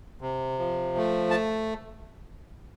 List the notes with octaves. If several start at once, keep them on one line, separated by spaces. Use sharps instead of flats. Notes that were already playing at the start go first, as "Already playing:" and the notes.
C3
F3
A3
A5